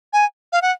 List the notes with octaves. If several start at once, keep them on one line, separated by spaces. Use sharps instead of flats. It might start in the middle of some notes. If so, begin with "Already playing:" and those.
G#5
F5
F#5